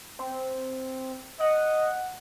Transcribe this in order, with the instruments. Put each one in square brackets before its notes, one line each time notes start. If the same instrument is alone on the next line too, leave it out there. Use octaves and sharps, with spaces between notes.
[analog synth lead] C4
[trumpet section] D#5 [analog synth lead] F#5